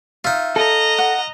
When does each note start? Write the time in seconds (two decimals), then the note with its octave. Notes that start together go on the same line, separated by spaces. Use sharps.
0.24 D#4 F4 E5
0.56 A4 D#5 A#5
0.98 F#5